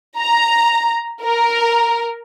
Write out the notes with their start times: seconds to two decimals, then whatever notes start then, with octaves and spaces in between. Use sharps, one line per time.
0.18 A#5
1.23 A#4